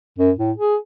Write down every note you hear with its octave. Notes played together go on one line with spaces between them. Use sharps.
F#2
A2
G#4